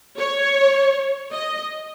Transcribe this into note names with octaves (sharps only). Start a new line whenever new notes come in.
C#5
D#5